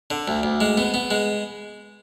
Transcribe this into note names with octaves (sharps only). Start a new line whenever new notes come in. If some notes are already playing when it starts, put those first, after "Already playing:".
D3
D2
D2
G#3
B3
B3
G#3